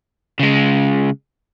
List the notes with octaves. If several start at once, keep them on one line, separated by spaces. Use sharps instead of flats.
C#3 G#3